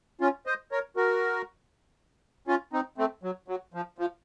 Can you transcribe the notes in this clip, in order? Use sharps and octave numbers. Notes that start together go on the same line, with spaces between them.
C#4 F4
C5 D#5
A#4 C#5
F#4 A#4
C#4 F4
C4 D#4
A3 C4
F#3
F#3
F3
F3